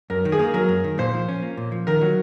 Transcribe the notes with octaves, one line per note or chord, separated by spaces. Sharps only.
F#2 A#4
D#3
G#4
A#3
F#3 A#4
F#2
D#3
A#2 C5
F3
C#4
A#3
A#2
F3
D#3 A#4
F#3